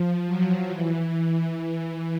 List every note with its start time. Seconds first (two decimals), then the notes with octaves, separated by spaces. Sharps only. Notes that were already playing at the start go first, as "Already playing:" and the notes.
Already playing: F3
0.27 F#3
0.70 E3